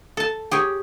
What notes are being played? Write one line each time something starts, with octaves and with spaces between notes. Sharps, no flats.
A4 A5
G4 G#4 C#5